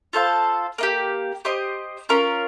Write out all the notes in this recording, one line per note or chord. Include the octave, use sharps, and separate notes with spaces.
F4 A4 C5 F5
A#3 D#4 G4
G4 C5 D#5
C#4 F4 A#4